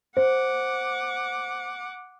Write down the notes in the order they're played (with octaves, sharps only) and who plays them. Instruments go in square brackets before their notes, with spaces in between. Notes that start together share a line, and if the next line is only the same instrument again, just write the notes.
[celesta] C5 [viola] F#5 D6